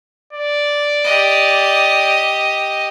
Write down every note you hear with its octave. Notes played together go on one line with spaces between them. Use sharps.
D5
G4 D#5